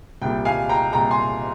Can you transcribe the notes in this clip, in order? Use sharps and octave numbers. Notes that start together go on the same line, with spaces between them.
C2 A#2 G3 G5
F5 G#5
G5 A#5
C2 A#2 G3 G5 A#5
G#5 C6